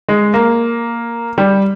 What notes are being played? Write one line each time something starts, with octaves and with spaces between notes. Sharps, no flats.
G#3
A#3
G3